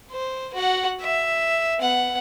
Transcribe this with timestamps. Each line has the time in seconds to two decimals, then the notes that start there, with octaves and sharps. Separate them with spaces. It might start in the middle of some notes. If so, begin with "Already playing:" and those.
0.12 C5
0.54 F#4 F#5
1.01 E5
1.79 B3 F#5